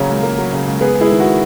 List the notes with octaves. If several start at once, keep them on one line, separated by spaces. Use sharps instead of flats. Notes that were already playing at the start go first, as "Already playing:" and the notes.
Already playing: C#3 F#3 A#3 A#4 C#5
C#2
A#3
F#3
C#3
C#2
B3 G#4 B4
G#3
E4 G#4
D#3
F#4